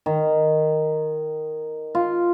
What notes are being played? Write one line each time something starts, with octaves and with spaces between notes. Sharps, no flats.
D#3
F4